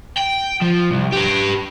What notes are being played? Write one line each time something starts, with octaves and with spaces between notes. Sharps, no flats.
G5
F3
C2
G4 B4